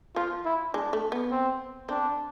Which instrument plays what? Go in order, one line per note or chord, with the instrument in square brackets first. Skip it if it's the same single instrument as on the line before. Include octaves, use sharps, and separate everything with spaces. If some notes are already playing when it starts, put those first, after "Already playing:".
[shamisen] F3 [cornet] F4
[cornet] E4
[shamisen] G#3 [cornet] D4
[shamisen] A3
B3
[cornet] C4
[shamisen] C4 [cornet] D4